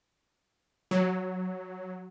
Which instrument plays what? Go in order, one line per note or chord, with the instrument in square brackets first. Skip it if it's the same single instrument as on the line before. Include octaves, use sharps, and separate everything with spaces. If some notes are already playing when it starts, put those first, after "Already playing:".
[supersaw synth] F#3